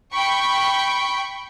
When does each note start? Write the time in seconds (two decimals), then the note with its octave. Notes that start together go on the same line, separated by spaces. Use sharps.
0.12 G5 B5 C#6